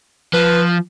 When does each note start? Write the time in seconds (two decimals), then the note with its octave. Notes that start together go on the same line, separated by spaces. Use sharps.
0.33 F3 B4